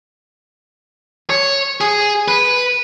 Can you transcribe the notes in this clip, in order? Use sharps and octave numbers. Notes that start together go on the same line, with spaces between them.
C#5
G#4
B4